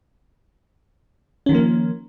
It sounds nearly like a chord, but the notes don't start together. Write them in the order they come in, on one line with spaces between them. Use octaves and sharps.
C#4 D#3 F3 A#3